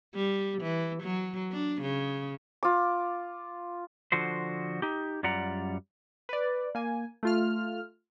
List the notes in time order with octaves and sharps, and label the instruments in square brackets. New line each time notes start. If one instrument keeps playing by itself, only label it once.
[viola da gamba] G3
E3
F#3
D4
C#3
[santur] F4 D6
[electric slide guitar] D3 F3 F#4 C5
D#4 G4
F#2 G3 F4 D5 F#5 A#5
[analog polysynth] B4 D5
A#3 G#5
A3 F4 F6